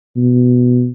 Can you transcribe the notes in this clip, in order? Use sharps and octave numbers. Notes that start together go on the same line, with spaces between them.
B2